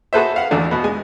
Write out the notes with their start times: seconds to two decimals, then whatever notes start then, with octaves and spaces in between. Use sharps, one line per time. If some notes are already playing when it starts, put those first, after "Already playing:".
0.13 F#4 G#4 A4 B4 C5 E5
0.36 F5 F#5
0.51 G#1 E2 A3 D4
0.71 B2 B3
0.84 G#3 G#5